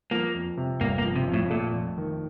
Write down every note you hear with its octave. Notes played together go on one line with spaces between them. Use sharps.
F3 A#3
F2
C3
G1 A#3
A#3
F3
C3
F2
A2
A#2 A3
F2
D#3